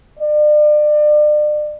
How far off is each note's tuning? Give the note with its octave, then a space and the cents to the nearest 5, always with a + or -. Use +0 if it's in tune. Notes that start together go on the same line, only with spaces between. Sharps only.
D5 +35